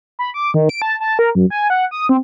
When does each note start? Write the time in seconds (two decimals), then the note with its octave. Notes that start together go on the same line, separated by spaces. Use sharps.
0.19 B5
0.34 D6
0.54 D#3
0.69 D7
0.82 A5
1.00 A5
1.19 A#4
1.35 F#2
1.50 G#5
1.70 F#5
1.91 D#6
2.09 C4